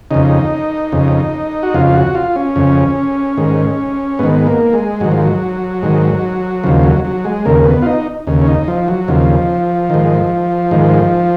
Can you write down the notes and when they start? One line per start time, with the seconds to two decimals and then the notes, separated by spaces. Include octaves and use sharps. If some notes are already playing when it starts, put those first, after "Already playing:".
0.11 F2 C#3 D#4
0.92 F2 C#3
1.63 F#4
1.74 F2 C#3 F4
1.94 F#4
2.15 F4
2.36 C#4
2.56 F2 C#3
3.37 G#2 D#3
4.19 G#2 D#3 B3
4.47 A#3
4.73 G#3
5.00 G#2 D#3 F#3
5.12 F3
5.22 F#3
5.82 G#2 D#3
6.64 D#2 C#3 F3
6.83 F#3
7.04 F#3
7.25 G#3
7.45 D#2 C#3 A#3
7.65 B3
7.82 F4
7.86 D#4
8.27 D#2 C#3
8.42 C#4
8.47 D#4
8.68 F3
8.88 F#3
9.08 D#2 C#3 F3
9.90 G#2 D#3
10.71 G#2 D#3